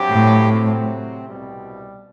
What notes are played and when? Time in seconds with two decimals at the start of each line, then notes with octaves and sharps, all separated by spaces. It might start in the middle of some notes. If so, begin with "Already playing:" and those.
Already playing: G2 F#3 C4 G4
0.12 A2
0.50 C3 F#3 C4
1.27 C2 B2 G3